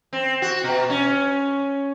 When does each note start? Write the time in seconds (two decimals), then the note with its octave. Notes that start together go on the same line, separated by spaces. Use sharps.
0.13 C4
0.42 F#4
0.64 B2
0.90 C#4